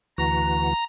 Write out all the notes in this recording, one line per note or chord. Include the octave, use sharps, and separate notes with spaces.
D2 E3 F#4 A#5